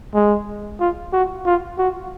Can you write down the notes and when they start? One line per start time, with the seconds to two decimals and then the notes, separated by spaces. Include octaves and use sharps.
0.14 G#3
0.80 F4
1.13 F#4
1.46 F4
1.79 F#4